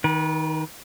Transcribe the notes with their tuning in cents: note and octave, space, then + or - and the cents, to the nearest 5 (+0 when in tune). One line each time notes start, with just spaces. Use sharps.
D#3 +10 B4 -30